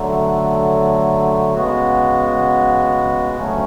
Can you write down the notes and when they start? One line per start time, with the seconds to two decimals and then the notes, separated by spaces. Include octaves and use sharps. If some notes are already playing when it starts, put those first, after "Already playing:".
Already playing: D3 F#3 A3
1.54 C#3 G#3 B3 F#4
3.36 D2 C#3 F#3 A3 C#4